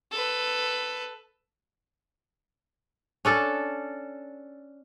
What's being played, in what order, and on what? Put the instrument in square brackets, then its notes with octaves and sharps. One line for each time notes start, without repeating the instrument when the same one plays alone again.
[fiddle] A4 B4
[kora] C#4 D4 A4